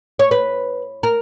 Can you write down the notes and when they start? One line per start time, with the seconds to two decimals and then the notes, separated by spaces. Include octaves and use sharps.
0.19 C#5
0.31 B4
1.03 A#4